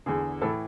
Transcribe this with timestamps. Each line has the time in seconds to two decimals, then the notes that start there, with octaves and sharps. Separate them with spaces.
0.06 E2 D3 G#4
0.41 A2 E3 A4